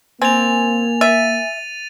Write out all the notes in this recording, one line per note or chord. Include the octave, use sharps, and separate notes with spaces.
A#3 C4 G#5 A6 F7
E5 A6 D#7